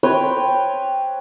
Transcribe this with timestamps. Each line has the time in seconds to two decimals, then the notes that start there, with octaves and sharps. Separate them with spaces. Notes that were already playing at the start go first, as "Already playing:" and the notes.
0.03 C4 B4 C#5 G5